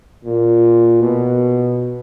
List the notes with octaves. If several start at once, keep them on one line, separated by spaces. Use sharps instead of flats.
A#2
B2